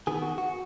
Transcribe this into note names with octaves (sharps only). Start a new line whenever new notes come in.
D#3 B3 G#4
F#4
F#4